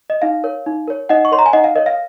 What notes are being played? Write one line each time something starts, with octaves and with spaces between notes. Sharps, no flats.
D#5
D#4 F5
A#4 C#5
D#4
A#4 C#5
D#4 D#5 F#5
C#6
A#4 C#5 C6
A#5
G#5
D#4 D#5 F#5
F5
A#4 C#5 D#5
F5